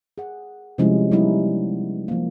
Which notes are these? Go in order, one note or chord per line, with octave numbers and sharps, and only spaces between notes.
G#4 F#5
C3 F3 G3 G#3 C#4 E4
F#3 G3 B3 D#4 E4
F3 A#3